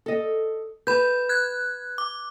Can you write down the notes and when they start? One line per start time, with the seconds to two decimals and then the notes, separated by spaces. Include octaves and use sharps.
0.06 A4 D#5
0.87 B4 B5 G6
1.29 F#6 G#6
1.98 D6